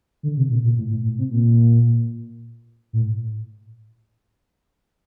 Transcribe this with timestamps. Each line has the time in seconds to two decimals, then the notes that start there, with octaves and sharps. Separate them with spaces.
0.23 D3
0.37 C3
0.50 A#2
0.64 A#2
0.77 A2
0.90 A2
1.04 A2
1.18 C3
1.31 A#2
2.93 A2